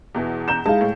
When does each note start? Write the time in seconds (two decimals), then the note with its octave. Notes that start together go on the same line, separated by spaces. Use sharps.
0.15 E2 B2 E3
0.48 A#5 G6 E7
0.66 G#3 D#4 E4 F5 A5
0.81 A2